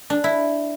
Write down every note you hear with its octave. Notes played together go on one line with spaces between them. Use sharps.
D4
E4